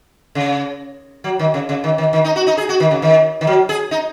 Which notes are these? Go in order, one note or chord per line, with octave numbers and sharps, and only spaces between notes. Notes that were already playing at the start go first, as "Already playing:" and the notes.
C#3
F#3
D#3
C#3
C#3
D#3
D#3
D#3
D#4
F#4
D#4
G#4
F#4
D#3
C#3
D#3
D#3
F#3
G#4
D#4